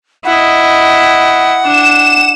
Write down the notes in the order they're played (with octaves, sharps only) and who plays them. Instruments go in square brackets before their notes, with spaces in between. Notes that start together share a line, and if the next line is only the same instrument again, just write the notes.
[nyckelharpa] E4 D#5 [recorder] F#5
[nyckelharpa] D4 [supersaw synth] E7